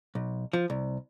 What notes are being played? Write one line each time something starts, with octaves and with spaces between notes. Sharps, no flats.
B1
F3
C2